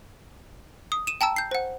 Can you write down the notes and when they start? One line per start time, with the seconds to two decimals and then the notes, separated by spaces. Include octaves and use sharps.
0.92 D#6
1.07 D#7 E7
1.21 G5 A5 A#5 E6
1.36 G6 C7
1.51 C5 F#5